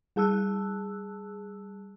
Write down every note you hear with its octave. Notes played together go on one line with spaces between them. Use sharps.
G3 G#4 A5 E6 F#6